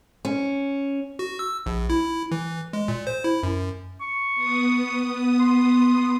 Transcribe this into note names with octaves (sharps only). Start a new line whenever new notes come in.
C#4
F#4
E6
A#1
E4
E3
G#3
A#2
C5
E4
F#2
C#6
B3 D#6
C6